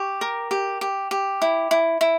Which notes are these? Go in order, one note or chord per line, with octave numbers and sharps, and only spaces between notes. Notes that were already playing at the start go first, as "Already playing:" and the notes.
Already playing: G4 C#6
A#4
G4
G4
G4
E4
E4
E4